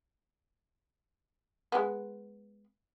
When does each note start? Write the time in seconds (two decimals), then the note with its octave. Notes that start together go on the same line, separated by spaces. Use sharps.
1.72 G#3 B3